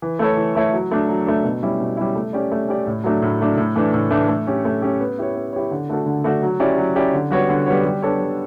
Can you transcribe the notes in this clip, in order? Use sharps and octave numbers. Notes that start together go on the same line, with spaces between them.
E3
A3 E4 A4 C#5
E3
A3 E4 A4 C#5
F#3
A3 D4
F#3
A3 D4
B2
G3 C#4 E4
B2
G3 C#4 E4
A3
C#4 G4 D5
A3
C#4 G4 D5
A2
F#3 A3 D4
A2
F#3 A3 D4
A2
E3 A3 D4
A2
E3 A3 D4
A3
C#4 G4
A3
C#4 G4
B3
E4 G4 C#5
B3
E4 G4 C#5
D3
A3 D4 F#4 A4
D3
A3 D4 F#4 A4
F#3
C#4 E4 G4 D5
F#3
C#4 E4 G4 D5
D3
G3 B3 F#4 C#5
D3
G3 B3 F#4 C#5
G3
B3 D4 A4 C#5
G3